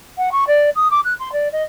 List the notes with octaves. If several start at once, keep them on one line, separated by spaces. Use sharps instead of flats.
F#5
C#6
D5
D#6
D6
F#6
C6
D5
D#5